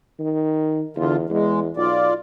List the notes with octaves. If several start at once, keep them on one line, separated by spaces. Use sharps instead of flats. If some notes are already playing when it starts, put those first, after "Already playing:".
D#3
E2 D3 F4
E2 G#3
B1 F4 D5